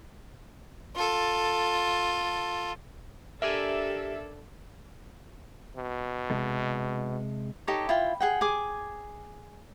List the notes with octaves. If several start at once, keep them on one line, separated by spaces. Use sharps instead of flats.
F4 A4
D4 G4 A4 A#4 D5 E5 G#5
B2
C3 G#3 A4
D#4 G4 A4 C#5
E4 F4 G5
G#4 F#5 G5
G#4 G#5 D6